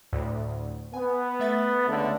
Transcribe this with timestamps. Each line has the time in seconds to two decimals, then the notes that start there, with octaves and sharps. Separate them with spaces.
0.13 D2 A2
0.94 B3 G#5
1.40 A3 E5 A6
1.86 C#2 D3